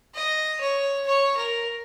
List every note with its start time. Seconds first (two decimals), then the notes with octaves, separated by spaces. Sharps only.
0.15 D#5
0.60 C#5
1.06 C#5
1.37 A#4